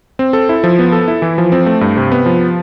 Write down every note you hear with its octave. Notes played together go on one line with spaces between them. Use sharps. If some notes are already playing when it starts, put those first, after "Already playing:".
C4
A4
E4
F3
B3
A4
E4
E3
F3
C4
A3
G2
C3
B3
F3